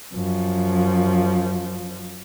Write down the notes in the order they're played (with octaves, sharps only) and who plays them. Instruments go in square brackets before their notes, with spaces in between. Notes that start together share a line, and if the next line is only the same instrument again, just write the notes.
[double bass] F#2 F3